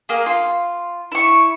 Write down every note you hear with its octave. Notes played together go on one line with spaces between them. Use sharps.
A#3 G#4
F4
E4 C#6